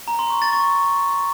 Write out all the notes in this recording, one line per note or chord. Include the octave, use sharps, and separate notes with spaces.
A#5
C6
C#6
A6
C#6